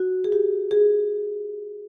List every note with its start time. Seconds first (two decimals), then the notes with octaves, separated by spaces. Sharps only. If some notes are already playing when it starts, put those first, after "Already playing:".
Already playing: F#4
0.24 G#4
0.32 G4
0.71 G#4